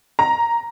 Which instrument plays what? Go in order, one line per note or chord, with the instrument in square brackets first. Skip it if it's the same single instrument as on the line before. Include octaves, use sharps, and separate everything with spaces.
[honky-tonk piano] A#5